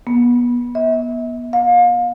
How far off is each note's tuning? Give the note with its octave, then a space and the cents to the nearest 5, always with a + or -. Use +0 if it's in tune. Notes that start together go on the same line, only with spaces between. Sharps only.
B3 -30
E5 -35
F5 +30